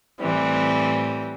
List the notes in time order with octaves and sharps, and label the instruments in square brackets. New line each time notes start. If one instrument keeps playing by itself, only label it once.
[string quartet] A2 E3 G3 C4